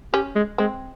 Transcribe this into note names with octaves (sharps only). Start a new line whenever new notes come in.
C#4 G4
G#3
G#3 C4